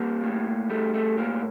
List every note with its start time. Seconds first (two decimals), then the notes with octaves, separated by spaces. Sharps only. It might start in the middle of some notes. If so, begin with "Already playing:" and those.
Already playing: G3 A#3
0.23 A2
0.70 G3 A3
0.94 A3
1.17 A2 A#3